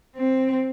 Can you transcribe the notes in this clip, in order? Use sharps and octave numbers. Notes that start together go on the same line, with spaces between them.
C4